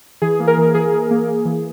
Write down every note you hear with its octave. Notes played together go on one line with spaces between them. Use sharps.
E3 G#4
A#3
A#4
E3
E3 G#4
E3
A#3
A#3
E3